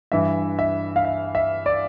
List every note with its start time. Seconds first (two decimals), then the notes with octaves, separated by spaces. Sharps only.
0.12 G2 E3 E5
0.59 E5
0.96 F5
1.05 E5
1.35 E5
1.66 D5